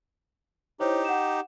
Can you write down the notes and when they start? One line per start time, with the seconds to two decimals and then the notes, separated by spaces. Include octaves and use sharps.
0.80 D#4 E4 G4 C5 C#5
1.05 F#5 E7